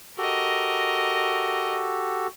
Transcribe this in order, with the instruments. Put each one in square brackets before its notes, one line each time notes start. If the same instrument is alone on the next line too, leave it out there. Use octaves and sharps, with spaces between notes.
[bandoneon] F#4 G4 A4 [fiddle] A#4 D#5